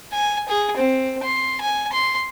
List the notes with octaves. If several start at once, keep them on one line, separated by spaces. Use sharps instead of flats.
G#5
G#4
C4
C6
G#5
C6